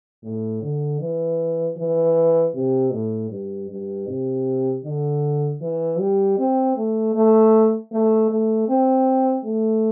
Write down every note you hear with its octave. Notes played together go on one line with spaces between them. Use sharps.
A2
D3
E3
E3
C3
A2
G2
G2
C3
D3
E3
G3
C4
A3
A3
A3
A3
C4
A3